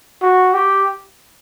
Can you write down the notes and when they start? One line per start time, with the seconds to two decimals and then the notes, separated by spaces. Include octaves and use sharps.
0.22 F#4
0.54 G4